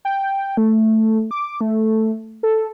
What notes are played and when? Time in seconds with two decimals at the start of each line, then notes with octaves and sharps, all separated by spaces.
0.05 G5
0.57 A3
1.31 D6
1.61 A3
2.43 A4